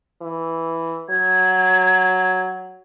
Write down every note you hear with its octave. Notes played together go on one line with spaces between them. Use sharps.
E3
F#3 G#6